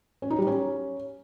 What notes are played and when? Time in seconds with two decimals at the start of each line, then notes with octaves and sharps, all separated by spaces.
0.22 C#4
0.30 D#4
0.39 G3
0.47 C#4